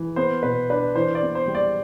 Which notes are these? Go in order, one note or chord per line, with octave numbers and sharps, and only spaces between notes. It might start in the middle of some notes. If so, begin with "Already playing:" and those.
Already playing: E3
B3 C5
B2 B4
D4 B4
E3 C5
D5
B3
C5
G3
D5